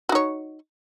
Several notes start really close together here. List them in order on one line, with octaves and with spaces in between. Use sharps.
F#4 D#4 C#5